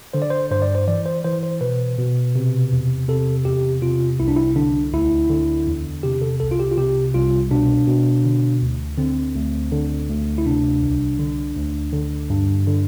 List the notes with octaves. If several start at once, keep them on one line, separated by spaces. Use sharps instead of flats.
D3 C5
D5
C5
G2 C5
D5
C5
E3 D5
C5
E3 C5
C5
B2 B4
B2
C3
E2
C3 A4
E2 G4
C3 F4
C2 E4
D4
E4
D3 D4
D2 E4
D3
E2
C3 G4
A4
C2 A4
F4
G4
F4
C3 G4
C2 F4
B2 D4
B2
D3
D2
D3 C4
D2
D3
D2
E4
C3 D4
C2
D3
D2
D3
G2
D3